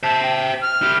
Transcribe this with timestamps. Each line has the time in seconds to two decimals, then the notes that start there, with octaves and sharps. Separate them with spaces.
0.03 C5 E5 A5
0.22 G5
0.61 F6
0.82 E4 G4